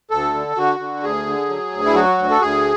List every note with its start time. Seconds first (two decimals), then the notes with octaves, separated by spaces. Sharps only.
0.10 D2 A4
0.34 D3
0.56 D3 F#4
0.80 D3
1.03 D2 G#4
1.26 D3
1.49 F#3
1.72 D2
1.86 E4
1.94 F#3 F#4
2.18 D2
2.30 A4
2.41 D2 G#4